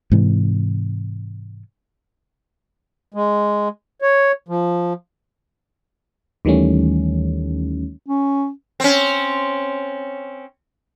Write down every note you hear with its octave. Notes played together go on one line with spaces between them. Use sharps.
G#2 C3 E3
G#3
C#5
F3
D#2 D#3 E3 G3 A3 C#4
C#4
C4 C#4